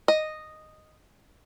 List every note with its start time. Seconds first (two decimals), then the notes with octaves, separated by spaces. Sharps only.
0.08 D#5